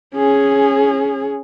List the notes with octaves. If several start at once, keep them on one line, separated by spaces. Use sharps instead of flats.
C#4 G#4